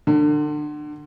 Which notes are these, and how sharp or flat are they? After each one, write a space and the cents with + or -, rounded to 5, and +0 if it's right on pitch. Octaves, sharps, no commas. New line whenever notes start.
D3 +30